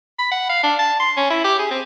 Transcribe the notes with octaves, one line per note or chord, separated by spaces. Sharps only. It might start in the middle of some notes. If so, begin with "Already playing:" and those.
B5
F#5
F5
D4
A5
C6
C#4
E4
G4
G#4
C4